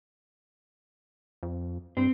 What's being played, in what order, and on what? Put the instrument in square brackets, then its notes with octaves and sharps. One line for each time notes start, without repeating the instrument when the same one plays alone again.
[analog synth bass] F2
[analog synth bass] G2 [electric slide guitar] C4